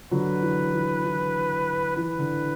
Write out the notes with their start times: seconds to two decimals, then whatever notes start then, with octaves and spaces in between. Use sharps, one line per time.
0.11 D3 F#3 B4
0.42 E3
0.73 E3
1.04 E3
1.96 E3 B4
2.19 D3